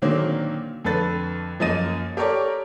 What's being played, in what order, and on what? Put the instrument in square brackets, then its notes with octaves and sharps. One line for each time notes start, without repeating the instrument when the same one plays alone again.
[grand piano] A#2 D3 D#3 F#3 A#3 C4
F2 D3 A4 B4 A6
F#2 F3 A#3 D#5 A6 D#7
G4 A4 A#4 C#5 D5 D6